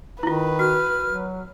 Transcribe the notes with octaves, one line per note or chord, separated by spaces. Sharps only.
D#3 E4 F4 B4
F#4 F6
F#3